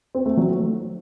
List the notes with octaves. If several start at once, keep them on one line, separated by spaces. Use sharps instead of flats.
C4
A3
F#3